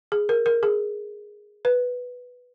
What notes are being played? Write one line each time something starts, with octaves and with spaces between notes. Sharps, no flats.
G#4
A#4
A#4
G#4
B4